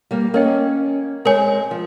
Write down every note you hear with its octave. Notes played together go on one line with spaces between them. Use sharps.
G3 A#3
A#3 C#4 A#4 D#5 G5
G#3 C4 A#4 C#5 G#5
F3